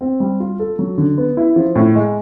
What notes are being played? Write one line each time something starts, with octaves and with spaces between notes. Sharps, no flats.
C4
G3
F4
A4
F#3
D3
B3
E4
F3
A2
G#3